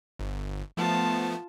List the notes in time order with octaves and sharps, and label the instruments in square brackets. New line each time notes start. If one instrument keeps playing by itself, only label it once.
[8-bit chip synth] G1
[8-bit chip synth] F3 A3 B3 [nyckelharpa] F4 A5